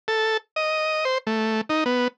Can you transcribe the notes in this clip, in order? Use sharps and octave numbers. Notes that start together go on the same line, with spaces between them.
A4
D#5
C5
A3
D#4
B3